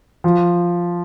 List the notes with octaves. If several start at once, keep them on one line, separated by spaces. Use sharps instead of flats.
F3